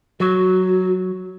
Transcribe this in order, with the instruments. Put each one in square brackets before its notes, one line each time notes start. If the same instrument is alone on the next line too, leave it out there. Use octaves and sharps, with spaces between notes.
[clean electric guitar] F#3 [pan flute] F#4